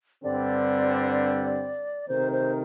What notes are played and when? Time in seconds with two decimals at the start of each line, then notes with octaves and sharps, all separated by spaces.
0.23 G2 D3 G3 C4 D5
2.08 C3 D#3 A3 D#4 A#4 C5
2.32 C5